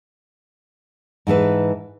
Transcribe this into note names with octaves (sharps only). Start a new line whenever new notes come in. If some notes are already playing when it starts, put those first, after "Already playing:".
G#2 E3 A4 B4